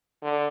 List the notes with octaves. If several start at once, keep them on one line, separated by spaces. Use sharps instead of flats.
D3